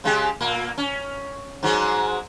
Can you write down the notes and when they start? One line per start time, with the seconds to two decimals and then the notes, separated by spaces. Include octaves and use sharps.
0.04 C#3 G#3 G4
0.41 A#2 A#3
0.78 C#4
1.63 G#2 F#3 G#3